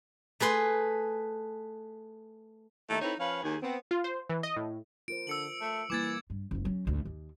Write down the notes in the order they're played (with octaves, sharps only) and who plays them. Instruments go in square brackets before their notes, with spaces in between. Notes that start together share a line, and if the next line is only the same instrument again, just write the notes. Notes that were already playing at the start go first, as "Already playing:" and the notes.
[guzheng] A3 G#4 B4 C6
[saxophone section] D#2 A3 D#4 E5
C4 D#4 E4 A4 B4 C#5
F3 C#4 B4 F5
D#2 G#4
B3 C4
[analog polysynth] F4
C5
E3
D#5
A2
[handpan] F4 A#4 C5 [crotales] D7
[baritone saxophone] D3 [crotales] E6 C#7 F#7
[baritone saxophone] A3
[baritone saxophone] E3 [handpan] G3 A#3 [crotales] D6 G#6 A6
[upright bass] G2
F#1 F3
F#3 C#4
G#1 D2
D#2